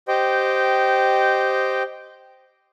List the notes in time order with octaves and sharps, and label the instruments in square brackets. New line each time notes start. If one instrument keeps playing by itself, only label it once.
[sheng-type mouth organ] G4 C5 D#5 G5